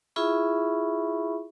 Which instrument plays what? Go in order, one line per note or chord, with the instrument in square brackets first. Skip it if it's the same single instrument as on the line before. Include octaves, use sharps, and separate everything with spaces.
[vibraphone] E4 F4 G#4 E5 B5 C#6